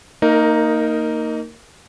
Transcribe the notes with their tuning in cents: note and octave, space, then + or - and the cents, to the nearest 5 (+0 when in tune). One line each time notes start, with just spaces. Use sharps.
A#3 -30 D#4 +0 A#4 +0